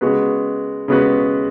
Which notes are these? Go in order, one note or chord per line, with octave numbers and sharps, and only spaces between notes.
C#3 G#3 B3 F#4 B4
C#3 G#3 B3 F#4 B4